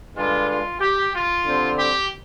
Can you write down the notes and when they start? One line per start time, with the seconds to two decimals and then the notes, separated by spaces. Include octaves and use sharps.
0.16 G2 D3 G#3 D4 F4
0.49 F4
0.81 G4
1.13 F4
1.45 D3 G3 C4
1.77 G4